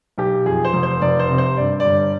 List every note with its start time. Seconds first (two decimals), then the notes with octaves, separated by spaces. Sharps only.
0.18 B1 G4
0.46 F2 G#4
0.65 C5
0.73 F1
0.83 C5
1.02 F1 D5
1.19 C5
1.29 C3
1.38 C5
1.57 G2 D5
1.80 G1 D5